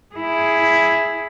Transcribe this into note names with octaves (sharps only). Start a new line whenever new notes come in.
E4 G#4